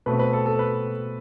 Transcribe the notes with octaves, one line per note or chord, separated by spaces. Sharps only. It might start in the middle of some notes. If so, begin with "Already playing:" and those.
B2 A3 C4 B4
B4
A4
A4
B4